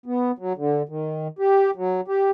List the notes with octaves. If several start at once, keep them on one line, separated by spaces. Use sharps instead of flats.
B3
F#3
D3
D#3
G4
F#3
G4